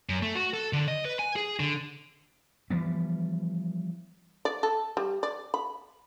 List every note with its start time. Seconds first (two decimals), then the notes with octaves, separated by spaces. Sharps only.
0.09 F#2
0.22 A3
0.35 F#4
0.54 A4
0.73 D3
0.88 D#5
1.05 B4
1.19 G#5
1.36 G#4
1.60 D3
2.70 E3 F3 G3 B3
4.45 D5
4.63 A4
4.97 G3
5.23 D5
5.54 B5